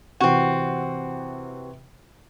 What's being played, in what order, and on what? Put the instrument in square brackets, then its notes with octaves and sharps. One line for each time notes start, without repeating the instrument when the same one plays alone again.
[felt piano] C3 E3 [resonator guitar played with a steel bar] C4 F#4